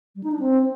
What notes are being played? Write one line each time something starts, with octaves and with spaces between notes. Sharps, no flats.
G3
D#4
D4
C4